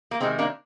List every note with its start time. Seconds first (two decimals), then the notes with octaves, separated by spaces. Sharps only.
0.11 A#3
0.21 C3 D#3 G#3 C4
0.39 A#3 D4